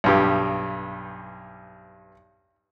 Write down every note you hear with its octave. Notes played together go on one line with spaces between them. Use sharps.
B1 G2 G4